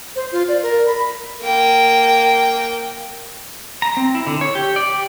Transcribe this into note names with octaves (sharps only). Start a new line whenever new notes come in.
C5
F4
D5
A#4
B5
A#3 G5
A#5
C4
E4
D3
C#5
G4
D5
G4